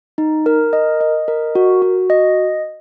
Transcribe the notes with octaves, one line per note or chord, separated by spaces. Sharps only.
D#4
A#4
D#5
D#5
A#4
F#4
F#4
D#5